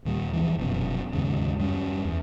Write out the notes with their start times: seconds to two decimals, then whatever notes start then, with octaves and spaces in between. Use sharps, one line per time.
0.05 D#2 A#2 G3
0.33 F2 E3
0.59 F1 F#2 B2
1.13 D#2 G#2 C#3
1.59 F#2 G3 A3 C#4
2.05 E2